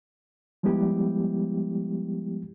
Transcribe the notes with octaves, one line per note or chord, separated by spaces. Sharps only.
F3 G3 G#3 B3 E4 G4